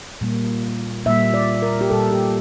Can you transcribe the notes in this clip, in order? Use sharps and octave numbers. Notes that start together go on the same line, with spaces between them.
A#2 G3 A#3
A#2 G3 A#3 E5
D5
A#4
G4
A#2 G3 A#3 A4
G4